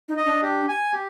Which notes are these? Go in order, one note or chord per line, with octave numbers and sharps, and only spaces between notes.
D#4
D#5
D4
G4
G#5
G4